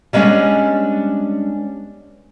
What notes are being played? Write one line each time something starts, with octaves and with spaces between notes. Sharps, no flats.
G3 G#3 A#3 B3 C#4 D4